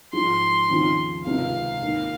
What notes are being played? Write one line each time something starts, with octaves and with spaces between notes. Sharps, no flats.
G#2 F3 G#3 D#4 C6
D#2 C#3 F3 C4 D#4
C#2 C3 D#3 F5
D#2 D#3 A#3